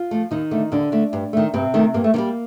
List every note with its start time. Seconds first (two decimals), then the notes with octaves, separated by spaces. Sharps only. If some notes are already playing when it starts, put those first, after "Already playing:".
Already playing: F4
0.11 F3 A3
0.31 D#2 D#3 D#4
0.51 D3 A3
0.72 D#2 D3 D4
0.92 D3 A3
1.13 G2
1.33 D#3 A3
1.54 G2 C3 C4
1.74 D#3 A3
1.94 G2 A#3
2.04 A3
2.14 D#3 A#3
2.18 G3